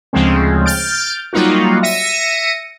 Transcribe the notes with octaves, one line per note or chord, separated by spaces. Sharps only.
D2 C#3 F3 G#3 C4
F6 G6 A6 D7
F#3 G3 A#3 D#4 F4 F#4
E5 A#6 C#7 D#7